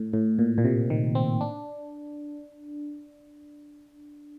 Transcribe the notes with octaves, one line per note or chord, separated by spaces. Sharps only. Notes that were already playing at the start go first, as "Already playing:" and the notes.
Already playing: A2
A2
A#2
A#2
C3
D#3
C4
D4